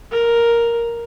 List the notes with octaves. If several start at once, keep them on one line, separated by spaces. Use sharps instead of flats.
A#4